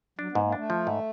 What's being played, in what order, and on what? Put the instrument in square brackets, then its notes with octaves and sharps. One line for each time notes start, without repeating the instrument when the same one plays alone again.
[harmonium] F#3 [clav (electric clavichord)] D4
[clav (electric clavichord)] G#2 [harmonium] B3
[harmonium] A#3
[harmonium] A3 [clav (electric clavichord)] D4
[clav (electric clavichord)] F3
G#2